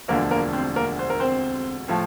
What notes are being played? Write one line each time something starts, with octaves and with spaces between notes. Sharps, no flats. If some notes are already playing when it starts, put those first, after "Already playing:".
E1 D2 D3 F3 A#3 A#4
A#3 A#4
C4 C5
A#3 A#4
C5
A#4
C4 C5
A2 F3 A3